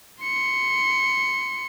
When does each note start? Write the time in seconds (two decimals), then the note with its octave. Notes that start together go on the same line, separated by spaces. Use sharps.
0.23 C6 C#7